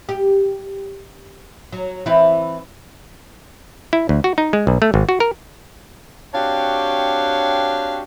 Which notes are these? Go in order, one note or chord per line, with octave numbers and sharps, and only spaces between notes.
G4
F#3
E3 C4 E4
E4
D2
F#4
D#4
G#3
B1
A3
G#1
F#4
A#4
C4 D4 F#4 G4 C#5 F5